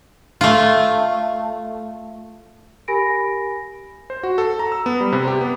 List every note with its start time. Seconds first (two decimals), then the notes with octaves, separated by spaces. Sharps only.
0.41 A3 F4
2.88 G4 A#4 G#5 B5 A#6 D7
4.10 C5
4.23 F#4
4.38 A4
4.59 A#5
4.72 E6
4.86 B3
5.01 G3
5.12 C3
5.28 G4
5.41 B3